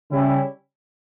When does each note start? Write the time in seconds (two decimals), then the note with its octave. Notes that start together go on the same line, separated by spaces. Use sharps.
0.11 C#3 G3 C#4 E4